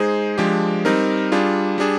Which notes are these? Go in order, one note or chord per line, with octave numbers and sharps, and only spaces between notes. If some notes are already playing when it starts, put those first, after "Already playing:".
Already playing: G#3 D#4 G#4 C5
F3 G#3 D4 G4
G3 C4 D#4 A#4
G3 D4 F4 G#4
G3 D4 G#4